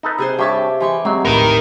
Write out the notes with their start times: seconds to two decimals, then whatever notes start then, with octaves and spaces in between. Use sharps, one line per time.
0.03 D#4 A4 B4
0.18 C3 G#4 C5
0.39 G2 G4 C#5 E5 A5
0.81 E3 G#3 G4 C#6
1.05 F#3 G#3 C4 D#5
1.25 A#1 D#2 A2 D#4 A#4 B4